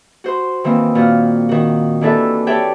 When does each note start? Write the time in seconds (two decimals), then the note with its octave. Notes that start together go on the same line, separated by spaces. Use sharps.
0.24 F#4 C5 C6
0.64 D#3 E3 A#3 C4
0.95 A#2 F#4 F6
1.49 D#3 F#4
2.01 D#2 E3 D4 E4 A4 E5
2.47 G4 C#5 D5 E5 G5 A5